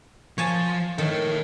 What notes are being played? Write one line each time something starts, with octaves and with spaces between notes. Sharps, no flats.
F3 C#5 G#5 A5
D#3 A4 C#5